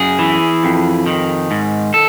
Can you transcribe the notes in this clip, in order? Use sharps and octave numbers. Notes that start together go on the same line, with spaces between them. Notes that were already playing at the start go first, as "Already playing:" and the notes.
Already playing: F#2 G#4
E3
F2
D#3
G#2
A4